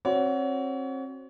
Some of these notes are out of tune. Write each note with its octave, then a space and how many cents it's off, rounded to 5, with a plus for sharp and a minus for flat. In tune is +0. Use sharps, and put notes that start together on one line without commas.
C4 +35 F#4 +0 C#5 +35